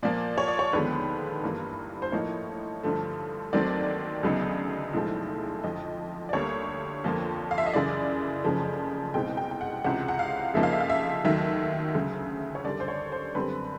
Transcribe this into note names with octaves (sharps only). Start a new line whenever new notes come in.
A#2 F3 A#3 D5
C#5
D5
C#5
D#2 D3 F3 G#3 B3 B4
G1 G2 E3 G3 A#3
C5
A2 F3 A#3 D#4 C#5
G2 D3 F3 A3
D#2 D#3 F#3 A3 C4 D5
D2 C#3 F#3 B3 D#4
B1 A2 F3 G#3
F2 D3 F3 D#5
D5
D2 D3 G3 A#3 C#5
F2 D3 F3 A#3
F5
E5
D#5
F#2 C#3 E3 D5
F#1 F2 C#3 F3 A3
C2 B2 G#3 C4 D#4 G5
G5
G5
F#5
C#2 C3 E3 G#3 C#4 F#5
F#5
F5
F2 C#3 F3 A#3 D#4 E5
F5
E5
F5
E5
D#2 D#3 F#3 A3 E5
D2 C#3 F#3
C#5
F#2 D3 G3 D5
C5
C#5
C5
F#2 D3 G3 C4 B4